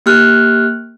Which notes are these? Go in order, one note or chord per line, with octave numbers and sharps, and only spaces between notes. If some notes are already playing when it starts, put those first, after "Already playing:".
A#3 G4 F6 F#6